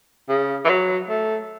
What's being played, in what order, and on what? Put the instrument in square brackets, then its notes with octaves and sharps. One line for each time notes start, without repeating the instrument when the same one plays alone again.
[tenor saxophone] C#3
E3
F#3
A3